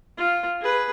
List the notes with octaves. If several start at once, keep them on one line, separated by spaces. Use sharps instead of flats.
F4
G#4 B4